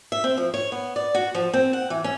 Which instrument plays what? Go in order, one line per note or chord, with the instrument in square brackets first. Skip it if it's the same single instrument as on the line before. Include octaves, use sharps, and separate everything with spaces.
[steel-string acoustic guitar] E5
C4
F3
C#5
B3
D5
F#4
F3
C4
F#5
E3
C#4